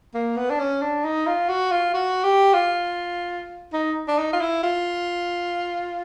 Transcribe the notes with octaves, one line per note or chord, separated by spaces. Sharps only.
A#3
B3
D4
C#4
D4
D#4
F4
F#4
F4
F#4
G4
F4
D#4
D4
D#4
F4
E4
F4